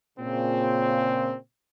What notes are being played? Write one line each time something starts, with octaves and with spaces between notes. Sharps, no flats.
A#2 C#3 C4